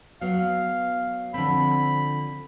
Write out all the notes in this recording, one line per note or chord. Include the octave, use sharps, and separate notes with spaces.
F#3 B3 F5
D3 F3 C4 B5